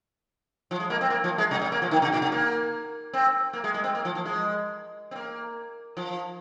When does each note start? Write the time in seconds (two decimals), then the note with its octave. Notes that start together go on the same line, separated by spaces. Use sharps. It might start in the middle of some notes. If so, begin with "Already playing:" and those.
0.71 F3
0.80 G#3
0.90 A#3
1.01 C4
1.10 A#3
1.24 F3
1.38 G#3
1.51 C3
1.62 C3
1.72 A#3
1.82 F3
1.91 D#3
2.02 C3
2.13 A#2
2.22 C3
2.32 A#3
3.13 C4
3.53 A#3
3.64 G#3
3.74 G#3
3.84 C4
3.95 A#3
4.05 F3
4.15 F3
4.25 G#3
5.11 C4
5.15 A#3
5.97 F3